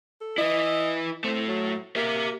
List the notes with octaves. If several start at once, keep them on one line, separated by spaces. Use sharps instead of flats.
A4
E4 B4 D#5
A2 A3 C4
F#3
A#3 G4 E5